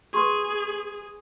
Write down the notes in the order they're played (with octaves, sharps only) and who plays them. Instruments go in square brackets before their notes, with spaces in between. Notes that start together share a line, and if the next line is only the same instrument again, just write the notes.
[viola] G#4 [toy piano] B4 C6 C#6